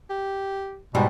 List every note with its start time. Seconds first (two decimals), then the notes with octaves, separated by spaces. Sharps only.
0.10 G4
0.95 G#2 B2 G3